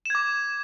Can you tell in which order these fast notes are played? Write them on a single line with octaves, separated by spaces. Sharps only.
E7 G#6 D6